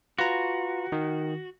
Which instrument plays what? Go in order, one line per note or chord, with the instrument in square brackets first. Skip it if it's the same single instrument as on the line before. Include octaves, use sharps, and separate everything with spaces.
[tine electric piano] F4 B4 A#5 [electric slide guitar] F#4
[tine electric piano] D#3